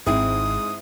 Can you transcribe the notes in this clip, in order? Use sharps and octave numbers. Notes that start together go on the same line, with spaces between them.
D#1 G#1 G#2 C4 E4 D#6